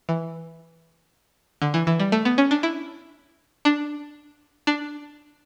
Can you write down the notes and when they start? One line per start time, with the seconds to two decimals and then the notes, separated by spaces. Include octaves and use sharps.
0.09 E3
1.62 D3
1.74 E3
1.87 E3
2.00 G3
2.12 A3
2.25 B3
2.38 C#4
2.51 D4
2.63 E4
3.65 D4
4.67 D4